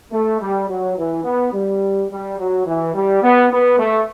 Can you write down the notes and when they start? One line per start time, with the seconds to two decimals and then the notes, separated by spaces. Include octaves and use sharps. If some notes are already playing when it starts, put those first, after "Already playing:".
0.12 A3
0.40 G3
0.68 F#3
0.97 E3
1.24 B3
1.53 G3
2.10 G3
2.39 F#3
2.66 E3
2.94 G3
3.23 B3
3.51 B3
3.79 A3